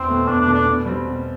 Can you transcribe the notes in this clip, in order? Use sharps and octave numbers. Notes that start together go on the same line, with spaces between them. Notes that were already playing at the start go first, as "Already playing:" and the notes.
Already playing: E2 C4
B2 A3
E2 D4
D4
B2 A3
D4
B2
G3 C4
B2